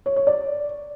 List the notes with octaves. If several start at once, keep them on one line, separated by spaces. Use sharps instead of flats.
C#5
C#5
D5